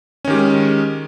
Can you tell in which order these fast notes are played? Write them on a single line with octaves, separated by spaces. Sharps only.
C#4 D#3 G4 G#3